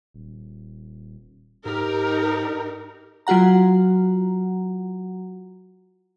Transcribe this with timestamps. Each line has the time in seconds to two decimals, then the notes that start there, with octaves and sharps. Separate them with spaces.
0.14 D#1
1.65 G#2 D#4 G4 A#4
3.27 F#3 F4 F#4 F#5 A#5